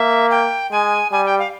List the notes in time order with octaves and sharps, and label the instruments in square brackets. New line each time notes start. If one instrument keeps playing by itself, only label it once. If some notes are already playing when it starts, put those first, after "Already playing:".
Already playing: [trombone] A#3 [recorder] E5
[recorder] G5
[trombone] G#3 [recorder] G#5
[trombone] G3 [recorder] G#5
[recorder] G5
F5